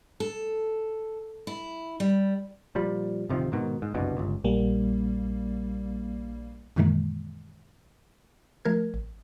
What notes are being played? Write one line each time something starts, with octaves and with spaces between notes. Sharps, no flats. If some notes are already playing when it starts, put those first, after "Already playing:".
A4
E4
G3
A#2 F3 G3
D1 C3 D#3 F3
G#2 B2 D#3
G#2
F#1 C2 G2 B2
G1 C#2
A#1 G3 A#3
F#2 A#2 D#3 E3 G#3 A#3
F3 A3 A#4 G#6
A1